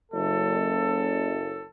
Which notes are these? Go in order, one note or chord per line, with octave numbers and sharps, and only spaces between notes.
F#1 A4